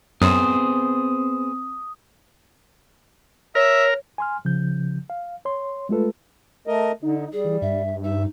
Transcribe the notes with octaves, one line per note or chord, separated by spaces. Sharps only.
F#2 B3 C4 G#4 C5 D#6
A#4 C#5 E5
G#5 C6 F6
C#3 F3 G6
F5
C#5 C6
G#3 A3 F4 A4 B4
A3 A#4 D#5
D3 D#4
G3 G#4
E3
G2 E5
D#4 E5